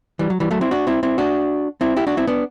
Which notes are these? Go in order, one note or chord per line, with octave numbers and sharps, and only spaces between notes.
E3 G3
F#3
E3 G3
F#3 A3
C4 E4
D4 F#4
C4 E4
C4 E4
D4 F#4
C4 E4
E4 G4
D4 F#4
C4 E4
B3 D4